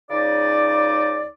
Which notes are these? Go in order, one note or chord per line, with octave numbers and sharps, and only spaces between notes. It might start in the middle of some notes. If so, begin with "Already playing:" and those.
C#2 C#3 D#4 D5